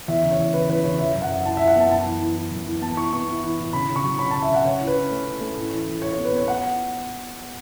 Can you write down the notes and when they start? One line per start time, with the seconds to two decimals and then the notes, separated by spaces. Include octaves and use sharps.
0.08 E2 E5
0.23 C#3
0.31 C#5
0.39 E2
0.54 C#3 B4
0.69 E2 B4
0.84 C#3 C#5
0.99 E4 E5
1.11 E5
1.14 F#2
1.22 F#5
1.30 F#2
1.44 E4 A5
1.57 E5
1.61 E4
1.68 F#5
1.76 B3 A5
1.91 F#2 A5
2.06 E3
2.21 E3
2.36 E3
2.51 F#2
2.66 E3
2.82 B3 A5
2.97 E4 C#6
3.13 B3 C#6
3.28 E4
3.44 E3
3.59 A2
3.73 C#3 B5
3.89 C#3
3.96 C#6
4.04 F#3
4.19 C#4 B5
4.31 A5
4.34 C#3
4.42 E5
4.50 C#3 F#5
4.64 C#3 C#5
4.81 E4
4.87 B4
4.96 C#4
5.11 A3
5.25 C#4
5.41 A3
5.57 A2
5.72 E3
5.87 A2
6.01 E4 C#5
6.13 C#5
6.18 B3
6.25 B4
6.32 B3 C#5
6.48 F#5